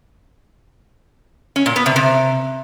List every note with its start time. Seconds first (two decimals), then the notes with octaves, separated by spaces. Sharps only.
1.56 C#4
1.66 A#2
1.76 B3
1.86 C3
1.96 C3